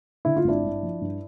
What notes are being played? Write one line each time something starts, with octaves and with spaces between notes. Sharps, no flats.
D3 E4
F4
G#1 D4 E4
G2
F3
G2